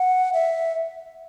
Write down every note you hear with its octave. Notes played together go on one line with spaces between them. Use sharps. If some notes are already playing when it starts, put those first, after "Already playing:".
Already playing: F#5
E5